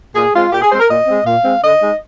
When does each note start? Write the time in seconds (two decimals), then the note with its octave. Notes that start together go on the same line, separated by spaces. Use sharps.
0.15 A#2 G#4
0.34 G#3 C4 F4
0.52 A#2 G4
0.62 G#4
0.71 G#3 C4 C5
0.80 A#4
0.89 A#2 D#5
1.07 G#3 C4
1.25 A#2 F5
1.44 G#3 C4
1.62 D3 D#5
1.81 G#3 D#4